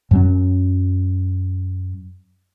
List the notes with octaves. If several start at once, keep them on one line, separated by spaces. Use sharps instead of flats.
F#2 F#3 C#4